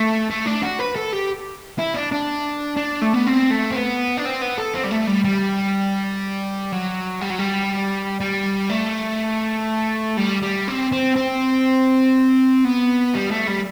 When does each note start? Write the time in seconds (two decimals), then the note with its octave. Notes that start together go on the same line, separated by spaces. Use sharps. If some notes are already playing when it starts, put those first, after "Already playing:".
Already playing: A3
0.30 A3
0.46 D4
0.63 F#4
0.79 B4
0.96 A4
1.13 G4
1.78 E4
1.94 D4
2.12 D4
2.77 D4
3.02 A3
3.14 B3
3.27 C4
3.51 A3
3.71 C4
3.76 B3
4.17 D4
4.25 C4
4.42 B3
4.58 A4
4.74 C4
4.84 G3
4.91 A3
5.07 G3
5.25 G3
6.72 F#3
7.21 G3
7.30 F#3
7.39 G3
8.21 G3
8.70 A3
10.18 G3
10.42 G3
10.68 C4
10.92 C4
11.16 C4
12.65 B3
13.15 G3
13.31 A3
13.48 G3